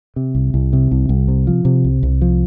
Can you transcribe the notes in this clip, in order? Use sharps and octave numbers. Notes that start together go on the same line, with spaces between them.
C3
C2
C2
C3
C2
C2
C3
F3
C3
C2
C2
F3